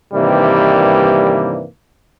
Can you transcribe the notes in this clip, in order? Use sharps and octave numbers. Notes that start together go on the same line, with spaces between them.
G2 C3 D#3 E3 G3 A#3